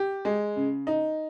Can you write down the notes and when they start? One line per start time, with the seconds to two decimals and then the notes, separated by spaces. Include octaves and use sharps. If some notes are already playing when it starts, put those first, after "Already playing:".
Already playing: G4
0.25 G#3
0.56 C#3
0.87 D#4